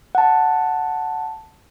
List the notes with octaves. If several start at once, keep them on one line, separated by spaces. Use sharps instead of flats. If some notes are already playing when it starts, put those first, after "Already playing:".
F#5 A5